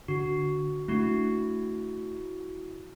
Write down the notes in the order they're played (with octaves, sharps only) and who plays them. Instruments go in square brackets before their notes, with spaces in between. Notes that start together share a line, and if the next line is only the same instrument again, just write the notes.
[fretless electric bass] D3 [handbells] F#4
[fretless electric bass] A3 C4 D4 [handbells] E4 F#4